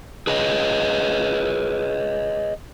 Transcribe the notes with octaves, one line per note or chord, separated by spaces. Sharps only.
G#4 B4 C#5 D#5